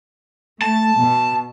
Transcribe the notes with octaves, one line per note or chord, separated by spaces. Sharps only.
A3 A5
B2